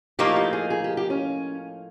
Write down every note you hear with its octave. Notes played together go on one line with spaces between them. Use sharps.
A2 F3 A#3 D#4 G4
G4
G#4
G#4
G4
G4
C#4